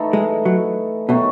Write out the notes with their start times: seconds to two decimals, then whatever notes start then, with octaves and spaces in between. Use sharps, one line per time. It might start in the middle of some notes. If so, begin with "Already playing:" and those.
Already playing: E3 A3 D#4 A4
0.13 G#3
0.45 F#3
1.09 B2 D#3 F#3 A3 D#4